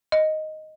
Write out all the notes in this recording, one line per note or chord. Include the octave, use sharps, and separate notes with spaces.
D#5